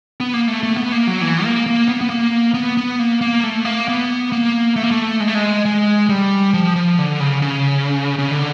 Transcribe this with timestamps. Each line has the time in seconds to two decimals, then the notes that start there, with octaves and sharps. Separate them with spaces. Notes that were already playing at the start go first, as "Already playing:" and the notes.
0.20 B3
0.33 A#3
0.48 A3
0.63 A3
0.77 B3
0.92 A#3
1.07 F#3
1.22 E3
1.45 A#3
1.66 A#3
1.88 B3
2.01 B3
2.10 A#3
2.54 B3
2.77 B3
2.99 A#3
3.21 A#3
3.43 A3
3.65 A#3
3.88 B3
4.32 A#3
4.76 A3
4.83 A#3
4.91 A3
5.20 G#3
5.28 A3
5.35 G#3
5.65 G#3
6.10 G3
6.54 F3
6.76 F3
6.98 D3
7.20 C#3
7.42 C#3
8.19 C#3
8.31 D3